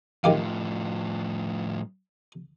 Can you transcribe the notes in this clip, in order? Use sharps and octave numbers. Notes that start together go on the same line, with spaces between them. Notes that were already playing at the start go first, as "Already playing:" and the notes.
A2 D#3 F3 G4 F5